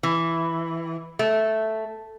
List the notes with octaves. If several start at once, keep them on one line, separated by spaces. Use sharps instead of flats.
E3
A3